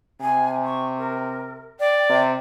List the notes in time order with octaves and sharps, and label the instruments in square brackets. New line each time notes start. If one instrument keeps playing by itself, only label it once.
[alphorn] C3 [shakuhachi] G#5
[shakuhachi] C#6
A#4
[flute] D5 [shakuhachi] G5
[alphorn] C3